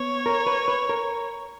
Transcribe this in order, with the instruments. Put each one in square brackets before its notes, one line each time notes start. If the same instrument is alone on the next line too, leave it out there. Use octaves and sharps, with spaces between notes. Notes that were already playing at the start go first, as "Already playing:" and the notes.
Already playing: [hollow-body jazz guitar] B3 [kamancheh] C#5
[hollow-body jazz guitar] A#4
B4
B4
A#4